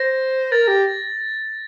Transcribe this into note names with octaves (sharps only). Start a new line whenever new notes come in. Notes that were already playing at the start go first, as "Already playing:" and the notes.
Already playing: C5 A#6
A#4 A6
G4